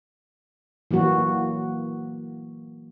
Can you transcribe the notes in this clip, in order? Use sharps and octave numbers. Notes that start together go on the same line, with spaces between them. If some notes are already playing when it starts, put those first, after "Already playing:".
E3 F#3 A#3 F#4